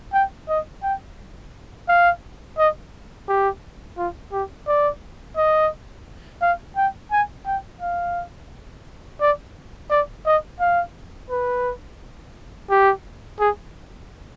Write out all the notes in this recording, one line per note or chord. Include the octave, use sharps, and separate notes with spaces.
G5
D#5
G5
F5
D#5
G4
F4
G4
D5
D#5
F5
G5
G#5
G5
F5
D5
D5
D#5
F5
B4
G4
G#4